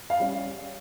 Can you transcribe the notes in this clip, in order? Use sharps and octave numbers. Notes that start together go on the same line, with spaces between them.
F5
G3 C#4